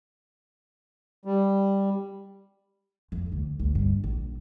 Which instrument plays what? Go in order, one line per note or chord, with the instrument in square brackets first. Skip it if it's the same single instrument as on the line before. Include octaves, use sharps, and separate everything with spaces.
[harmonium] G3
[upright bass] F2
D2
D2
G2
A#1